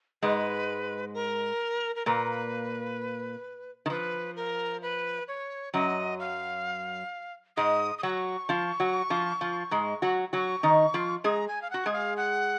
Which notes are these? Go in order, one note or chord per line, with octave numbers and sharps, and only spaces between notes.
G#2 G#3 B4
A#4
A#4
A#2 A#3 B4
D#3
F3 B4
A#4
B4
C#5
F#2 F#3 D#5
F5
G#2 G#3 D#6
D#6
F#3 F#4 C#6
F3 F4
F#3 F#4
F3 F4
F3 F4
G#2 G#3
F#3 F#4
F#3 F#4 C#6
D#3 D#4
F3 F4
G#3 G#4 A#5
G#5
F5
F#4 F#5
G#3 G#4
F5
F#5